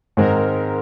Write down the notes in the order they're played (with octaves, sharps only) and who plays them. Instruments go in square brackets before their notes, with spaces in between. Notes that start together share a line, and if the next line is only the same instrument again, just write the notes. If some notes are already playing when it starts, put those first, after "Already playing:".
[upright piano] G#2 D#3 G#3 C4 [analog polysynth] A#4